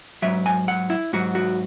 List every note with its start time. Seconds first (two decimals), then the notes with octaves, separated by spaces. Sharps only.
0.22 G#2 F#3 E5
0.46 G#5
0.68 F#5
0.90 E4
1.13 G#2 F#3 F#4
1.35 F#4